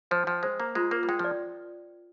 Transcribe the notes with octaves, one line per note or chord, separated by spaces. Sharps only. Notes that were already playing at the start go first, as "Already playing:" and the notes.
F3 C5
F3 G5
G#3 C5
A#3 A#5
G#3 F4
A#3 A#4
G3
G#3 G5
F3 D5